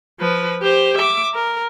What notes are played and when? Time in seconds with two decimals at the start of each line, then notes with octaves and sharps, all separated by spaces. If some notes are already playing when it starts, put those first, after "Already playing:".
0.20 F3 B4
0.62 G4 C5
0.98 E5 D6
1.35 A#4